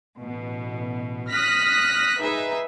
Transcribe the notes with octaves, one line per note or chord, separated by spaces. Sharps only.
A1 B2
D#6 F6 F#6 A#6 B6
D#4 G#4 B4 E5